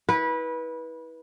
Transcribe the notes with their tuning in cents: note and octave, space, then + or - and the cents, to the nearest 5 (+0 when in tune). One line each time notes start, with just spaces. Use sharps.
E4 -30 B4 -20